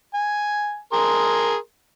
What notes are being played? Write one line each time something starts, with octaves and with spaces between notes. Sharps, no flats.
G#5
G#4 A#4 C6